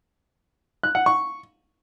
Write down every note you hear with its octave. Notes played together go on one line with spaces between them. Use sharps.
F#6
F#5
C#6